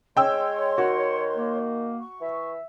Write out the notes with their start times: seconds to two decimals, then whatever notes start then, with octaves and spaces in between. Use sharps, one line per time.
0.17 G#3 C#5 G5 C6 E6
0.78 D#3 F#4 C#6
1.35 A#3
2.01 C#6
2.21 E3 E5